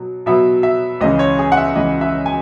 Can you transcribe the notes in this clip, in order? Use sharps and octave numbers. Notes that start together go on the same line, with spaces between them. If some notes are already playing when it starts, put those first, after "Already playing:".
Already playing: B2 F#3
B2 F#3 B3 E5
E5
C#2 C#3 E3 D#5
C#5
G#4
F#5
E5
C#2 C#3 E3 D#5
E5
G#5